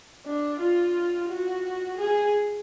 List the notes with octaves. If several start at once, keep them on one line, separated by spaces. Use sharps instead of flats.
D4
F4
F#4
G#4